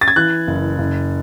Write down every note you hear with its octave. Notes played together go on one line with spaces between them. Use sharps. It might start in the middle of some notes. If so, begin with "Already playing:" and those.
A6
G#6
E3 F#6
F#1
F#1